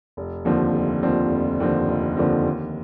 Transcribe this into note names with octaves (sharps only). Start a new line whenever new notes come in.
F1
D#2 D3 F3 C4
F1
D#2 D3 F3 C4
F1
D#2 D3 F3 C4
F1
D#2 D3 F3 C4
D#2